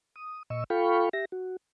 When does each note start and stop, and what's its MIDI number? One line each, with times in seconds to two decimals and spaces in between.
0.16 0.43 87
0.50 0.64 46
0.50 0.64 75
0.50 0.64 85
0.50 0.64 88
0.70 1.09 65
0.70 1.09 69
0.70 1.09 77
0.70 1.09 79
0.70 1.09 83
0.70 1.09 85
1.13 1.25 67
1.13 1.25 76
1.13 1.25 94
1.32 1.56 66